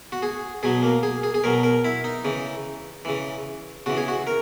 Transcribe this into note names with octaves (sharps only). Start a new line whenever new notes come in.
F#4
G#4
B2 F#3 G#4
A#3
G#4
G#4
G#4
B2 F#3 A#4
A#4
E4
D#4
C#3 E3
C#3 E3
C#3 E3 F#4
G#4
F#4
A#4